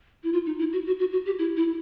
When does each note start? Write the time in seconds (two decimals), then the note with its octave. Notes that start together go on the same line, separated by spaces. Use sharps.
0.24 E4
0.33 F4
0.46 D#4
0.59 E4
0.73 F#4
0.86 F#4
0.99 F#4
1.12 F#4
1.26 G4
1.39 E4
1.57 E4